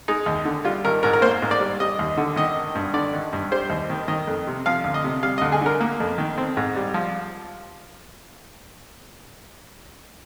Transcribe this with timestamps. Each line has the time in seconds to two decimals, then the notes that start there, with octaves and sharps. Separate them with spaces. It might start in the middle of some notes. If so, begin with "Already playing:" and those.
0.08 G#3 D#4
0.26 D#2
0.45 D3
0.64 G3 F4
0.85 G#1 A#4
1.03 G#2 A#4
1.13 A#4
1.22 A#3 C5
1.42 G#2
1.51 D5
1.60 G3
1.80 G3 D#5
1.99 D#2
2.18 D3
2.36 D#3 D#5
2.56 G#1
2.75 G2
2.94 D3 D5
3.14 G#1
3.33 G2
3.51 G3 C5
3.70 D#2
3.90 D#3
4.08 D#3 D#5
4.27 F2
4.47 C3
4.66 F3 F5
4.84 D2
4.94 D#5
5.04 C3
5.23 G3 F5
5.38 D#5
5.42 D2
5.52 G#4
5.61 D3 A#4
5.81 A#3
6.00 F2
6.18 D#3
6.38 C4
6.57 G#2
6.76 G3
6.94 F3